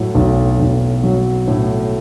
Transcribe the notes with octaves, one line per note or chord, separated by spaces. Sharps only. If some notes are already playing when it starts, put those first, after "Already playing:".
Already playing: A2 F#3
B1
B1
F#3
A2